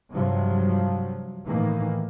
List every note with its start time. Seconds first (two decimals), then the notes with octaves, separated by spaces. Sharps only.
0.12 G2 C3 F3 F#3
1.46 A2 D#3 E3 A#3